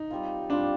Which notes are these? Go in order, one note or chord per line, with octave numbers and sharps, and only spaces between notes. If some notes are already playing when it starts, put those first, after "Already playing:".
Already playing: D#4
G3 C4 F4
G3 C4 D4 F4